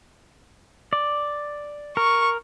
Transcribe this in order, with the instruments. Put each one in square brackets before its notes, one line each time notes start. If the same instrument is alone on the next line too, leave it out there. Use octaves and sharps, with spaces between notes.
[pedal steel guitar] D5
[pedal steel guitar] A#4 [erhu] C#6